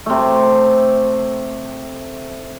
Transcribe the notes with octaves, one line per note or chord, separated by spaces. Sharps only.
C3 A3